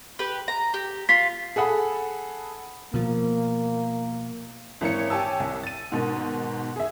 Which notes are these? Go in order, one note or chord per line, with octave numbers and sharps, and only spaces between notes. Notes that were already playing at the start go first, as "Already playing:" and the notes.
G4 B4
A#5
G4
F4 B6
G#4 A4 F#5 B5
B2 F3 A#3
G#1 E3 C#5 C#7
G4 C#5 G#5 A5 E6
C2
A6 D#7
G#2 B2 D#3
G#4 E5